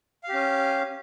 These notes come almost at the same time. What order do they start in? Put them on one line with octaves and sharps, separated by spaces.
F5 G4 C#4